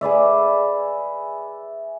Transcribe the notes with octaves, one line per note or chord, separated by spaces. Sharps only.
G#4 B4 D5 E5